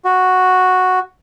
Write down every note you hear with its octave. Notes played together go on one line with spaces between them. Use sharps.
F#4